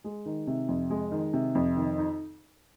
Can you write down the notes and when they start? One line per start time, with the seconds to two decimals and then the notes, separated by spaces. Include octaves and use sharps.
0.04 G#3
0.26 D#3
0.47 C3
0.69 F2
0.90 G#3
1.12 D#3
1.34 C3
1.55 F2
1.77 D#3
1.98 D#4